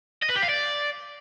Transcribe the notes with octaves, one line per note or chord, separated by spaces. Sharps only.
D#5
B4
G4
F5
D5